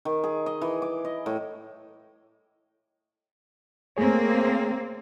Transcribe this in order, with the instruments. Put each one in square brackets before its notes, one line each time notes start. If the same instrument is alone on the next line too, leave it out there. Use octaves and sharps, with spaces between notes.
[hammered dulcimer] D#3
G#4
D#5
E3
D6
D#5
A2
[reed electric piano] A3 G#4 C#5 [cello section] A#3 C4